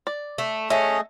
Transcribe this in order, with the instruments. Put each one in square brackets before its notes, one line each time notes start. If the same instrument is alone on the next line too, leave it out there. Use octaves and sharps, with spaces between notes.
[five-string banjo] D5
[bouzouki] A3
[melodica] A3 G#4 D#5 [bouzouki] C#4 [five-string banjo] E5